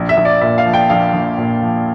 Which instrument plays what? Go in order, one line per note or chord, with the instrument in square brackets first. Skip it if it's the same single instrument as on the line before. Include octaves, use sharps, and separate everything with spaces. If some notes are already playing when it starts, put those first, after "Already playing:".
Already playing: [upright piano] A#1
E5
A#1
D5
A#2 E5
F5
F3
G5
A#1 F5
A#1
A#2
F3